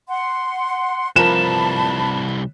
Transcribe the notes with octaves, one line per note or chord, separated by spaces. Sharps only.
F#5 C6
C2 F3 A#4 B4 A5 B5 E7